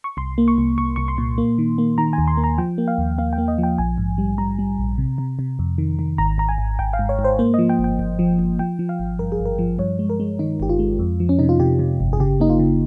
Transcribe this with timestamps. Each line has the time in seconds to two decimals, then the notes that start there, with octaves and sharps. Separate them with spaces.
0.04 C#6
0.17 C2 C6
0.38 A#3
0.48 C#6
0.58 C2
0.78 C2 C#6
0.96 C2 C#6
1.08 C6
1.18 A#2
1.38 A#3
1.58 D#3
1.78 A#3
1.98 D#3 A#5
2.13 G#5
2.18 D#2
2.28 C6
2.37 A#3
2.44 A#5
2.58 F3 G5
2.78 A#3
2.88 F5
2.98 D#2
3.18 A#3 F5
3.33 G5
3.38 A#3
3.48 D#5
3.58 F3
3.63 G5
3.78 A#1 G#5
3.98 G#2
4.18 G3
4.38 G3 A#5
4.59 G3
4.78 A#1
4.98 C3
5.18 C3
5.39 C3
5.59 F2
5.78 D#3
5.99 D#3
6.18 G#1 A#5
6.38 G#1 A#5
6.49 G#5
6.58 G#1
6.79 G#1 G5
6.93 F5
6.99 G#2
7.09 C#5
7.19 G#2
7.24 C5
7.39 A#3 C5
7.54 F3 D#5
7.69 G5
7.79 G1
7.84 G5
7.99 G1
8.19 F3
8.39 G1
8.59 F3 G5
8.79 F3
8.89 F5
8.99 G#1
9.19 G2 A#4
9.32 G#4
9.39 G#1
9.46 A#4
9.59 F3
9.79 G2 C#5
9.99 G#3
10.10 A#4
10.20 G#3
10.39 D#3 D#4
10.60 G1 G4
10.69 F4
10.79 G#3
10.99 F2
11.20 F3
11.29 C#4
11.39 C3 D#4
11.49 F4
11.60 C3 G4
11.79 C3
12.00 G1
12.13 G#4
12.20 C#3 G4
12.40 A#3 D#4
12.50 F4
12.59 C#3